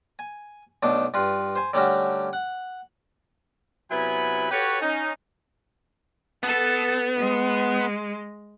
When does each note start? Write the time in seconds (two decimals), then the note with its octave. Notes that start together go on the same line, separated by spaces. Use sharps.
0.19 G#5
0.83 B1 B2 A3 D4
1.14 G2 F4 B4
1.56 C5 G#5
1.73 D3 F#3 G3 A3 C#4 F#4
2.33 F#5
3.91 C3 F#3 B3 E4 G#5 B5
4.51 F#4 G4 A4 B4 C#5
4.81 C#4 D#4
6.43 B3 A4
7.17 G#3